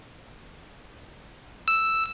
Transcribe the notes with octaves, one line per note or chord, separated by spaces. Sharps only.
E6